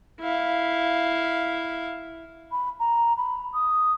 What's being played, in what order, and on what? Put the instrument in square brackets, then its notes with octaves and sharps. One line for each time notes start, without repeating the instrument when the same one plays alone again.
[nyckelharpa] E4 F5
[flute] B5
A#5
B5
D#6